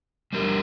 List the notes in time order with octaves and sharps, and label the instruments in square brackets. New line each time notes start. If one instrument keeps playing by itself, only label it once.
[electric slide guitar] G3 D4 G4 A#4